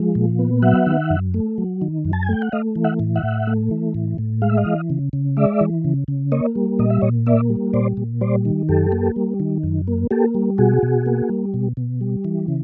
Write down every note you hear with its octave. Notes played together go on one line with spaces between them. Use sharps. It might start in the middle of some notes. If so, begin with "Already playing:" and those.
Already playing: F3 G#3
A#2
B3
F#3 E5 F#5
D#3
F#2
A3
F#3
D#3
F#2
A5
G#5
A3 G5
F#5
A3 D#5 F5
E3
E5 F#5
A2
E5 F#5
A2
A3
E3
A2
A2
G#3 F5
E5
D#5 F5
E3
C#3
C#3
G#3 D5 E5
E3
C#3
C#3
A#3 C#5 D#5
G3
A#2 D#5
E5
A#2 C#5 D#5
A#3 D5 E5
G3
A#2 C5 D5
A#2
G3 C5 D5
D#3
F#2 G4 A4
A#3
G3
D#3
F#2
A#3
A#3 G4 A4
G3
B2 F#4 G#4
B2
A#3
G3
B2
B2
G3
E3
C#3